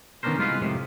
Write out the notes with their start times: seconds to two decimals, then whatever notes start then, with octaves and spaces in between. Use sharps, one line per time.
0.23 D#3 B3 C#4 D4 A#4 C5
0.38 C2 G#3 F4 B4 F5
0.61 F2 A2 C3 D#3